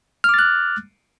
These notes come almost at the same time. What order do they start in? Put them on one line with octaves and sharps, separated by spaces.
F6 D6 A6 F#6